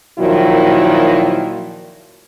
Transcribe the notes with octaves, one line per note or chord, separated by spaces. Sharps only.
A#2 D#3 F3 F#3 E4 F#4